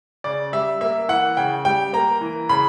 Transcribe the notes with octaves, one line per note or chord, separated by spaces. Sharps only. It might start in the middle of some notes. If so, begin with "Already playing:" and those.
C#3 D5
G3 E5
A#3 E5
E3 F#5
C#3 G5
G3 G5
A#3 A#5
E3
C#3 B5